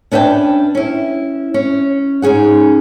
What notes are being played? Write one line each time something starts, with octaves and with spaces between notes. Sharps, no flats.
C#4 D4 B4 E5 G5 A5
C#4 E4
C#4
G#2 C#3 C#4 G#4 F#5